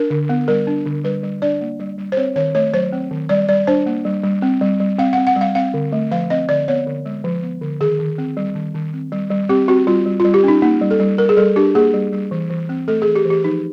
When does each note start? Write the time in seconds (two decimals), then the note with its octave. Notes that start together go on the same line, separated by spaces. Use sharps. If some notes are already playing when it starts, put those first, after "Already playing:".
Already playing: D4 A#4
0.10 D3
0.29 B3
0.48 G3 A#4
0.67 D4
0.86 D3
1.04 G3 B4
1.23 G3
1.42 D4 D5
1.61 A#3
1.80 G3
1.98 G3
2.12 C5
2.17 C4 C#5
2.36 D#3 C#5
2.55 A3 C#5
2.73 F#3 C5
2.92 C4
3.11 D#3
3.29 G3 D5
3.49 G3 D5
3.67 D4 C5
3.86 A#3
4.05 G3
4.24 G3
4.42 C4
4.61 G3
4.80 G3
4.98 C4 F5
5.13 C4 F#5
5.27 F#5
5.36 G3 F5
5.55 C4 F5
5.74 D3
5.92 A3
6.11 F3 F5
6.30 C4 D#5
6.49 D3 D5
6.68 B3 C#5
6.87 D3
7.06 G#3
7.24 F3
7.43 B3
7.62 D3
7.81 D#3 G#4
7.99 D#3
8.18 C4
8.37 G3
8.55 D#3
8.74 D#3
8.94 C4
9.12 G3
9.31 G3
9.49 C4 G4
9.68 C4 F#4
9.87 G3 F4
10.06 G3
10.20 G3 F4
10.34 G4
10.44 C#4 D#4
10.62 A#3 D#4
10.81 G3
10.91 A4
11.00 G3
11.18 G3 A#4
11.29 G#4
11.37 G3 A4
11.56 D4 G4
11.75 A#3 G#4
11.94 G3
12.13 G3
12.31 E3
12.50 E3
12.69 C4
12.88 A3 A4
13.02 G#4
13.07 E3
13.15 G4
13.25 E3
13.30 G4
13.44 F3 D#4